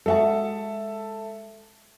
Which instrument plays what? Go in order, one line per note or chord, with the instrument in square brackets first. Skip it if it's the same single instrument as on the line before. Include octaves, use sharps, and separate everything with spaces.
[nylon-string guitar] G#3 F#4 [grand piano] A4 E5 A5